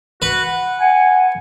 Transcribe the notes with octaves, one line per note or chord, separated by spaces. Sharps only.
F#4 B4
F#5
F#5 G#5